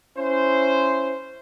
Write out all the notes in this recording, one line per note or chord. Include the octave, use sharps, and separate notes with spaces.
C#4 E4 C5